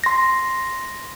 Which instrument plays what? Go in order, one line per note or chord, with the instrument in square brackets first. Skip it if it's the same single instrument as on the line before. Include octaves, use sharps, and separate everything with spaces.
[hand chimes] C6 A#6